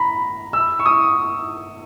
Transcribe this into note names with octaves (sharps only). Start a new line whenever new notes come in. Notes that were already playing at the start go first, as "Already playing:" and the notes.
Already playing: A#5 B5
E6
C#6
D#6